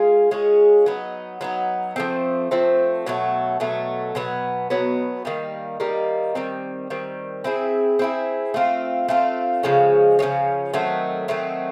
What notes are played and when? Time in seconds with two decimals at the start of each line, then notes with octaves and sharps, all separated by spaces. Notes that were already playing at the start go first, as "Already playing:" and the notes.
Already playing: G#3 C#4 F4 G#4
0.31 G#3 C#4 F4 G#4
0.86 F#3 B3 D#4
1.41 F#3 B3 D#4
1.96 F3 A3 C4
2.51 F3 A3 C4
3.06 B2 F#3 A3
3.60 B2 F#3 A3
4.15 B2 F#3 B3
4.70 B2 F#3 B3
5.25 D#3 G3 A#3 D#4
5.80 D#3 G3 A#3 D#4
6.35 D#3 G3 C4
6.90 D#3 G3 C4
7.44 C4 E4 G#4
7.99 C4 E4 G#4
8.54 A3 C4 F4
9.08 A3 C4 F4
9.63 C#3 F3 G#3 C#4
10.19 C#3 F3 G#3 C#4
10.74 D#3 F#3 A3 C4
11.28 D#3 F#3 A3 C4